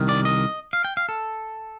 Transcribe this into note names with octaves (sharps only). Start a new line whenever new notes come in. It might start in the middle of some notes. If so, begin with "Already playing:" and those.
Already playing: C2 D#3
D5
D#5
F5
G5
F5
A4